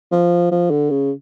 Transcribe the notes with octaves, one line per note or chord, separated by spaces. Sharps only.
F3
F3
D3
C#3